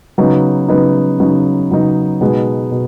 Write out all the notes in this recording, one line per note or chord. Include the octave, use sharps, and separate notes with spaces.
C#3 F#3 B3 D#4
C#3 F#3 B3 D#4
C#3 F#3 B3 D#4
C#3 F#3 B3 D#4
B2 G#3 B3 D#4 G#4
B2